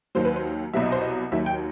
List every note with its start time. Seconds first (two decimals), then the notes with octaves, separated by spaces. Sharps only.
0.15 D#2 D#3 F#3 C5
0.25 B4
0.36 C5
0.73 C2 B2 F#3 E5
0.82 D#5
0.92 C5
1.01 D#5
1.32 D#2 D#3 F#3 E5
1.46 G5